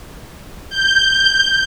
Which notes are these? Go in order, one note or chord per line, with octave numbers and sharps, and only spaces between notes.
G6